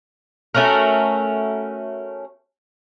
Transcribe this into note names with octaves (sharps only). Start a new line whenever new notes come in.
A3 C#4 F#4 A#4